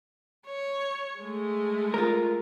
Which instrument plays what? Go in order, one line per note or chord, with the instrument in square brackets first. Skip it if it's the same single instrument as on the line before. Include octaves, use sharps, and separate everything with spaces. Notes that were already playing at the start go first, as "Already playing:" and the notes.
[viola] C#5
G#3 A3
[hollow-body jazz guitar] F4 A#4